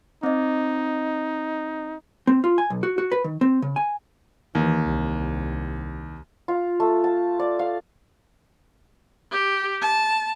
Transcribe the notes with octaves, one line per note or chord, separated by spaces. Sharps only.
C4 D#4 D#5
C4
F4
G#5
B1
F#4
F#4
B4
D#3
C4
C#3
G#5
D#2 E3
C2
F4
A3
A5
D5
F5
G4
A5